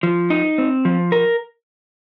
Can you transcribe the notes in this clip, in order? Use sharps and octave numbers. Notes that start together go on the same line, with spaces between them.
F3
D#4
C4
F3
A#4